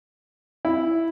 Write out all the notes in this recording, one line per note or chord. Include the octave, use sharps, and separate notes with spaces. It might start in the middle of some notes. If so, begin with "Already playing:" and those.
E4